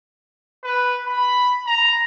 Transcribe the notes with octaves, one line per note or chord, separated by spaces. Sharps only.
B4
B5
A#5